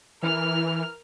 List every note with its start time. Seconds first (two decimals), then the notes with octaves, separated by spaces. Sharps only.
0.23 E3 A#4 F6